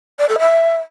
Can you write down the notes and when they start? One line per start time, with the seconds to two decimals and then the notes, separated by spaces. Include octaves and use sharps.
0.19 D5
0.29 A4
0.39 E5